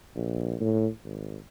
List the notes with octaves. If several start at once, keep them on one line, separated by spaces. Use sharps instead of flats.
A#1
A2
G#1